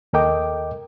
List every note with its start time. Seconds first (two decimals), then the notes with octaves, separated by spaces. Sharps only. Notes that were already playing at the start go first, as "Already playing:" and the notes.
0.13 D#2 A4 A#4 D#5 G5 D6